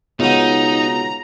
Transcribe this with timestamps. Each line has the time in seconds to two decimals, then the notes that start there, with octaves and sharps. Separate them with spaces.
0.20 C#2 B2 B3 D#4 A#5